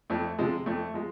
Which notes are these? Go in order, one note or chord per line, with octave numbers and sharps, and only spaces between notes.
F2 A3
C3 F3 G#3
F2 A3
F3 G#3